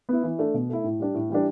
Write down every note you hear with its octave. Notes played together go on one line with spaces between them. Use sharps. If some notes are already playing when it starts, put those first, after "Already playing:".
B3 E4
E3
A3 D4
B2
A3 E4
A2
G3 D4
A2
E3 G3 D4